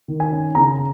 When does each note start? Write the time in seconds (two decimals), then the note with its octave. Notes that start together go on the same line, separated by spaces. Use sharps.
0.08 D#3
0.20 G#5
0.32 C#4
0.55 C#3 A#5